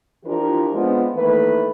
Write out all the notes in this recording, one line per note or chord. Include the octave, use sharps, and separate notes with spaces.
E3 F3 D4 F4 G4 A#4
F3 G#3 B3 C4 D4
D#3 E3 A3 A#3 B4